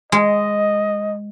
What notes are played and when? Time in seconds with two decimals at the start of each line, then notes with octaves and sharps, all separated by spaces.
0.12 G#3 D#5